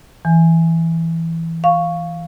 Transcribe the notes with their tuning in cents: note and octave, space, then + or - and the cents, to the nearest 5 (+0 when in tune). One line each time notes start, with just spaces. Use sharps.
E3 +0 G#5 +0
F5 +0 C#6 +0